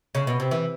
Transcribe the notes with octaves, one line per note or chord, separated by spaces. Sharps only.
C#3
B2
C3
E3